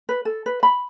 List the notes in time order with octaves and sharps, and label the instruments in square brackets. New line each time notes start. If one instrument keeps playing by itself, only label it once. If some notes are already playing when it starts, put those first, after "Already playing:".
[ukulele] B4
A4
B4
B5